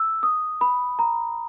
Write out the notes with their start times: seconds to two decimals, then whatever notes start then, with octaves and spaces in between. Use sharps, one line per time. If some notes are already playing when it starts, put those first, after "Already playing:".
Already playing: E6
0.23 D#6
0.61 B5
0.99 A#5